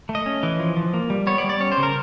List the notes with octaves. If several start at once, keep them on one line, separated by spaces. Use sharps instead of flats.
A3
D#5
C#4
E3
F3
F3
A#3
G3
B3 C#5
D5
G3
D5
C#4 C#5
C5
C#3
A#4